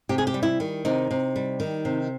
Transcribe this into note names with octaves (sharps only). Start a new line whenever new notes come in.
C3 G4
G#4
G4
G3
E4
D#3
C3 D#4
C3
G3
D#3
C3